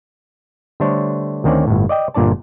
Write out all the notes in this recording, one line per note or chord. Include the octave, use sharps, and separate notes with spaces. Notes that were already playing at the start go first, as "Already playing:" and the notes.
D3 G3 A3 D4 C5 C#5
D2 D#3 C4 C#4 D5
G1 A2
D5 D#5 G5
G1 A#2 D4 D5 A5